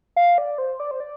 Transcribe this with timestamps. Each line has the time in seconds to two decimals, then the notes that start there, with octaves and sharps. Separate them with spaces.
0.16 F5
0.38 D5
0.58 C5
0.80 D5
0.91 C5
1.00 D5